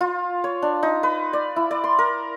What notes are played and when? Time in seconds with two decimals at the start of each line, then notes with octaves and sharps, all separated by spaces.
0.01 F4
0.44 C#5
0.62 D4
0.83 D#4
1.03 B4
1.33 D5
1.56 E4
1.71 D5
1.84 C6
1.99 A#4